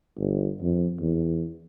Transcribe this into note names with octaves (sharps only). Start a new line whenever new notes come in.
G1
F2
E2